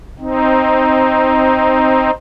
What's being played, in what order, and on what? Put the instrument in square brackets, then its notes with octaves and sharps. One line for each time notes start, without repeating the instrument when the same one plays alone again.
[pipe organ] C4 D#4